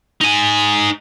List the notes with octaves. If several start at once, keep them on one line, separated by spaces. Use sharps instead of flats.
D#4 G#5